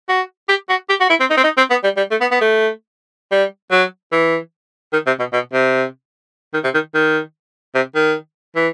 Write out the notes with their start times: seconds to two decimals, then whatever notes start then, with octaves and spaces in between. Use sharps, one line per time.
0.09 F#4
0.49 G4
0.69 F#4
0.89 G4
1.00 F#4
1.10 E4
1.20 C4
1.30 D#4
1.37 C4
1.44 D#4
1.57 C4
1.70 B3
1.84 G3
1.97 G3
2.11 A3
2.21 B3
2.31 B3
2.41 A3
3.31 G3
3.71 F#3
4.12 E3
4.93 D#3
5.07 C3
5.19 B2
5.33 B2
5.53 C3
6.54 D#3
6.64 C3
6.74 D#3
6.94 D#3
7.75 C3
7.95 D#3
8.56 E3